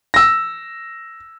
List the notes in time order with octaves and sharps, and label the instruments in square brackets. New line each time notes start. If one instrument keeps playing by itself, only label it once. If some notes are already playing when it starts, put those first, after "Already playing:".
[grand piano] E6 A#6